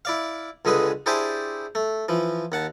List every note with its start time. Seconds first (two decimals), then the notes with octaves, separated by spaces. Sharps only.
0.05 E4 D5 F5
0.65 C#2 D3 G#3 G#4 B4
1.06 D4 E4 G4 G#4 C5 A5
1.75 A3
2.09 E3 F3
2.52 D#2 F#5 A5